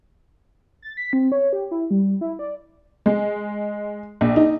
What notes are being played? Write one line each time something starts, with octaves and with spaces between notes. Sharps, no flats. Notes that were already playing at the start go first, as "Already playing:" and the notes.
A6
B6
C4
C#5
G4
E4
G3
E4
D5
G#3
A#1
D#4